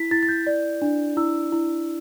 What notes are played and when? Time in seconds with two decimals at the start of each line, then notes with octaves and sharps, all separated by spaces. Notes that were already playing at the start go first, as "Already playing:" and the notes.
Already playing: E4 B6
0.11 E4 A6
0.23 A6
0.29 G6
0.47 D5
0.82 D4
1.17 E4 E6
1.52 E4